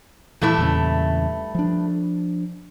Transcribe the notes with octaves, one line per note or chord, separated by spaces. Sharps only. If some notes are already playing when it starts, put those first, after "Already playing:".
G2 A#2 E3 A3 E4
E2 A#2 C#3
F3 D4